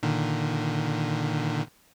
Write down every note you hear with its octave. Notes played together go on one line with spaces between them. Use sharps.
A#2 D3 D#3